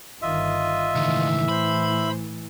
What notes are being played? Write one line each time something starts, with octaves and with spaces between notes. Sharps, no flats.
G1 D#3 F4 D#5 E5
C#2 A2 D#3 E3
C5 B5